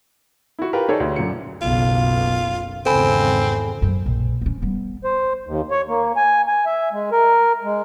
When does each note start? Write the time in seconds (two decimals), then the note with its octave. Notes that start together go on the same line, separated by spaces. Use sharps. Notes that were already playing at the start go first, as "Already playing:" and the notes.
0.59 E4 F#4
0.73 F4 G4 A#4 B4
0.89 D#4 G#4 A4 C#5 D5
1.00 D2
1.16 F#2 A#2 C#7
1.62 F#1 B1 F4
2.86 G#1 E2 C#3 C4 A4 G#5 B5
3.82 F#2
4.06 A#1
4.41 B3 C#4
4.62 G3 B3
5.04 C5
5.46 D#2
5.71 C#5
5.88 A#3
6.16 G#5
6.47 G#5
6.66 E5
6.92 G#3
7.12 A#4
7.64 G#3